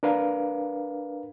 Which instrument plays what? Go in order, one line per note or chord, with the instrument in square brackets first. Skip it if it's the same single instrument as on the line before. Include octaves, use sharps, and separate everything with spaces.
[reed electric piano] D4 A#4 B4 F5